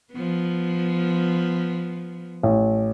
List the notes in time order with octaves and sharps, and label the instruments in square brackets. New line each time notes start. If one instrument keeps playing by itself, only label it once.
[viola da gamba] F3 B3
[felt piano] A1